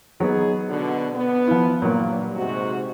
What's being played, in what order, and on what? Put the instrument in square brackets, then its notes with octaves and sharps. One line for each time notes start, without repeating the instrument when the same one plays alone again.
[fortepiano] F#3 B3 [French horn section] D#4 G#4 B4
[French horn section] B2 D3
B3
[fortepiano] F3 E4
[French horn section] G2 [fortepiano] A#2 F#3
[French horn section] G#2 C3 F#4